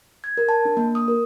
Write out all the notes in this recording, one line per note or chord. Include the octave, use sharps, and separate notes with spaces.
G#6
A#4
A5
D4
A#3
D#6
A#4